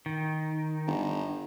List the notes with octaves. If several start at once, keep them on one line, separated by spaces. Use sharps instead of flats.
D#3
G1